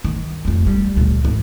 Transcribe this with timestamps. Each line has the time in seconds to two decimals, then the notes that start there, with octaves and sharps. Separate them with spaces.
0.04 D#3
0.45 F2 A3
0.66 G3
0.96 D2 A#2
1.25 G#1